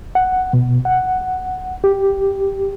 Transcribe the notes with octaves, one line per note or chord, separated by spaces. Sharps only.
F#5
B2
F#5
G4